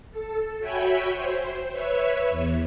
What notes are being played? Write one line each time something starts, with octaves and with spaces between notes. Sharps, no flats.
A4
F#4 C#5 E5 G5 G#5 B5
C5
B4 C#5 E5
E2